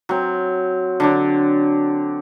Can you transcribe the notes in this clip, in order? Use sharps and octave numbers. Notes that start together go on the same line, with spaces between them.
F#3 C4
D3 F#3 D4